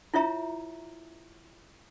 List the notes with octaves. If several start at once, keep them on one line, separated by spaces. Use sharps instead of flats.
E4 F4 C#5 E5 A#5